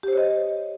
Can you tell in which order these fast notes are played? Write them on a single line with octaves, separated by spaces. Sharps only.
G4 C5 C#5 D#5